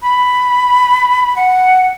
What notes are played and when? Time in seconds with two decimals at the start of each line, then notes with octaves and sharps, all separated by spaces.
0.02 B5
1.36 F#5